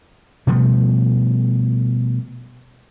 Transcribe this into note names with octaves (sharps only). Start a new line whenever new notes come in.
B2 F3 G3 A3